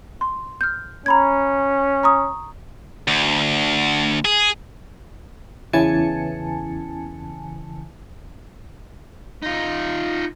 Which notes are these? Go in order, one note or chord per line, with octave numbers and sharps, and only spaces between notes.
C6
F6 G6
C#4 A#5 B5 G#6
A#5 C#6 D#6
D2
G#4
E2 C#3 E3 G#5 A5 C#7
D#4 F4